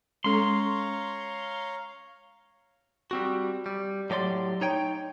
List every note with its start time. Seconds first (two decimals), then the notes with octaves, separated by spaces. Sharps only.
0.24 G#3 C#4 A4 C#5 F5 A#5 C6
3.11 G3 C4 F#4
3.66 G3
4.10 A2 F#3 G4 D5 C6
4.61 D#4 C#5 G5